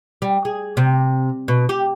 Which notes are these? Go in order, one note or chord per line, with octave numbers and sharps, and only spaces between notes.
G3
G#4
C3
B2
G4